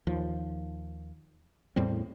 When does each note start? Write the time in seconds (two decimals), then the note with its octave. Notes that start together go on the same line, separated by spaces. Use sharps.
0.07 D#2 F3
1.76 E2 A2 G3 C4